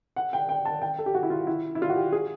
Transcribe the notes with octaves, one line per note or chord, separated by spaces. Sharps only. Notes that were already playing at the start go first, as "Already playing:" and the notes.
F#5
G5
G5
A5
G5
A4
G4
F#4
E4
F4
E4
E4
F4
F#4
G4
G#4